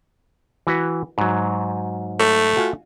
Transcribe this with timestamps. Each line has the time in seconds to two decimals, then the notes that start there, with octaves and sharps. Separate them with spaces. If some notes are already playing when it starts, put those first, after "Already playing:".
0.67 E3 F#4 B4
1.18 G#2 F#3
2.20 A3
2.57 F4 F#4 G#5